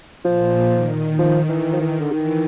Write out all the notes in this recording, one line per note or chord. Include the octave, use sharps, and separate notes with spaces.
A#2 F3
D#3
F3
E3
F3
E3
D3
D#3 E3